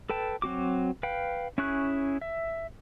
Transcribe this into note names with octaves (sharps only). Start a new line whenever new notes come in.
A4 B4 G5 A5
F#3 C4 F#4 D6
B4 F5 G5
C#4 E4 G#4 C#6 F#6
E5